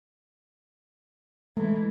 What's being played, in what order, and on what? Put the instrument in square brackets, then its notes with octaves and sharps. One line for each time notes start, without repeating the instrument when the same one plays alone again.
[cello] E3 G#3 [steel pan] A3